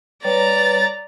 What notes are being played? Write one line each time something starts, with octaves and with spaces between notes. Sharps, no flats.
G3 B4 C#5 D5 A#5 A6